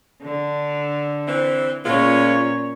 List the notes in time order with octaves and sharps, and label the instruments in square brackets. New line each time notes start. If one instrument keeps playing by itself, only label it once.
[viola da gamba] D3
[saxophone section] E3 C4
[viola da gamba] A#2 C#4 C#5 [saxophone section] G#3 B3 F4